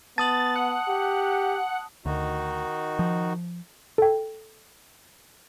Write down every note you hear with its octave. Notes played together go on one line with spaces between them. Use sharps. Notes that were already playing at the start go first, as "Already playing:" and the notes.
B3 A5 D#6 A6 F#7
F#5
G4
D2 D#3 D#4 F#4
F3
A4 G5